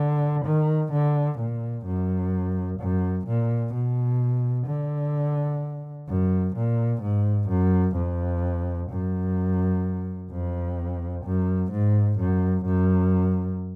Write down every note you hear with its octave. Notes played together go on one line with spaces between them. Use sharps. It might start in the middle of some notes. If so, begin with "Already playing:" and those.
Already playing: D3
D#3
D3
A#2
F#2
F#2
A#2
B2
D3
F#2
A#2
G#2
F#2
F2
F#2
F2
F#2
G#2
F#2
F#2